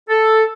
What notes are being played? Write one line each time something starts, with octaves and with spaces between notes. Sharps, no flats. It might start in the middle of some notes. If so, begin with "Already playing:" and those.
A4